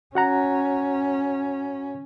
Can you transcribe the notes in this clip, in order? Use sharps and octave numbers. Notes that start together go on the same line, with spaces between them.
C#4 F#4 F#5 A#5